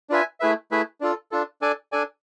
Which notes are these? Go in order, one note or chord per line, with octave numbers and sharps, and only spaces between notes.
D4 F4 B4 E5 G#5
A3 E4 G#4 B4 E5
A3 E4 G#4 B4 E5
D4 F4 A4
D4 F4 A4
D4 A4 D5 G#5
D4 A4 D5 G#5